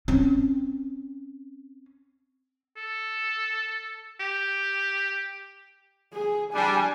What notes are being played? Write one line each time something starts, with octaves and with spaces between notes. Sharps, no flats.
C4 C#4
A4
G4
G#4
G3 D4 G#5